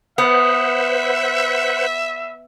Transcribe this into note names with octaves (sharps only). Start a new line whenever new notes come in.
B3 B4 C5 E5 F#5